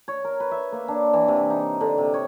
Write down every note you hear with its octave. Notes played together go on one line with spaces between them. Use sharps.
C#5
A#4
B4
E5
A#3
D4
E3
C3
D#4
D3
C3
C#5